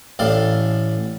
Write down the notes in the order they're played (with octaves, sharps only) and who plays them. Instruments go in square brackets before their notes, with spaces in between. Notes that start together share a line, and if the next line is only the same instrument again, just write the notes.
[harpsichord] A1 A2 D4 A4 F5